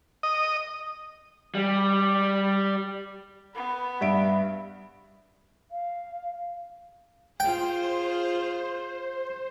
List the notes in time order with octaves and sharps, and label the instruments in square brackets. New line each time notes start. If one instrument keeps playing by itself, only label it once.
[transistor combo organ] D#5
[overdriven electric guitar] G3
[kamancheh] B3 B5
[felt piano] G2 E5 D7
[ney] F5
[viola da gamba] F4 G#4 [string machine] C5 [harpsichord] G5